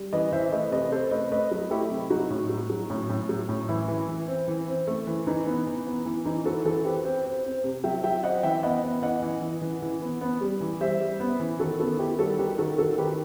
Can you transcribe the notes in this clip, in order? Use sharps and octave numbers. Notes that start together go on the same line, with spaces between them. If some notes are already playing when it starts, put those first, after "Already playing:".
Already playing: G3
E3 B4 D#5
E3 C5 E5
A3 B4 D#5
C3 B4 D#5
C3 A4 C5
A3 B4 D#5
A3 B4 D#5
F#3
A3 E4 G4
C3
F#3 D#4 F#4
A2
F#3
F#3
A2
A2
F#3
A2
E3 E4
E3
E3
C4
E3
C4
A3
E3
E3 D#4
B3
E3
B3
E3
E3 D#4
E3 F#4 A4
E3 F#4 A4
C4 G4 B4
C4
C4
C4
C3
F#3 E5 G5
F#3 E5 G5
C4 D#5 F#5
E3 E5 G5
B3 D#5 F#5
B3
E3 D#5 F#5
E3
E3
E3
E3
B3
B3
G3
E3
G3 C5 E5
G3
B3
E3
D#3 F#4 A4
B3 F#4 A4
D#3 E4 G4
G3 F#4 A4
D#3 G4 B4
D#3 F#4 A4
D#3 F#4 A4
D#3 G4 B4